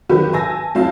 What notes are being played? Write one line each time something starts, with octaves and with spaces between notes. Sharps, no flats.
D#3 F#3 F#4 G4 B4
G#5 A5 E6 A#6
D2 F#3 C4 E4 F5 A5